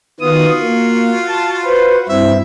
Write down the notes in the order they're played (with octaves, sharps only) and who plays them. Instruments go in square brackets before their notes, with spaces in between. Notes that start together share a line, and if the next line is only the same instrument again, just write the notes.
[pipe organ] D#3 B3 D#6 [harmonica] F4 F#4
[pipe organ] A#3
A5
B4 C5
[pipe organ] G2 C4 E4 [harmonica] E5